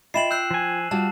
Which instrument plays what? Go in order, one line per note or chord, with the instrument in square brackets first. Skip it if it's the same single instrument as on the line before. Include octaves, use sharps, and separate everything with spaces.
[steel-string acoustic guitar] F4 G5 [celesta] D#5 E5 B5 [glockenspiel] C7 E7 F#7
[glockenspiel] E6 F#6 C7 [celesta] G6
[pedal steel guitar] F3 G#5
[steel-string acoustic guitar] G3 F4 F#4 [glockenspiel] A5